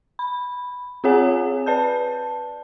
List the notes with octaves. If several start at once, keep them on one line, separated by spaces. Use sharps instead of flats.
B5
C4 F4 G#4 C#5 F#5 G#5
B4 D5 A5 G6